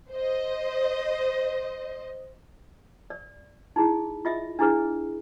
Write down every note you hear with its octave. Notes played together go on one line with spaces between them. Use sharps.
C5 D#5
D5
D#4 E4 G#4
F4 D#5 E5
D4 E4 G#4 B4